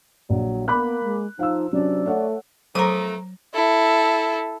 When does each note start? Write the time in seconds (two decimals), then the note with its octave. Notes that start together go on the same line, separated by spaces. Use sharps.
0.30 A#1 F#3
0.68 A#3 B3 B5 D6 F#6
1.03 G#3
1.39 F3 D#4 F5 E6
1.73 C3 F#3 C#4 D4 D5
2.06 A3 C#5 F#5
2.75 F2 F#3 A3 A#4 C5 A#5 D#6
3.54 E4 A4